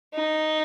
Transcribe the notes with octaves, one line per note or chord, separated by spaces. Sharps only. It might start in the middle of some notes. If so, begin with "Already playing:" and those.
D#4